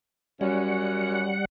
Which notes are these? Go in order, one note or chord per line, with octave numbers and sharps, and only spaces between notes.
F#2 G3 C#4 F#5